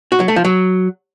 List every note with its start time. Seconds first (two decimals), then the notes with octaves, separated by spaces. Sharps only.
0.12 F#4
0.20 F#3
0.28 A3
0.36 F3
0.45 F#3